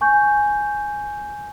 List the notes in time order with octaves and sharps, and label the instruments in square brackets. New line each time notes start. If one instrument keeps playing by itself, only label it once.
[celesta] G#5 C#6 G6